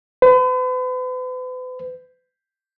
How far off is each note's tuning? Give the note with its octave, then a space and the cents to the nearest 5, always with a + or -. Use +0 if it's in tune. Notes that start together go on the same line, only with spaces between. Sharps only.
B4 +40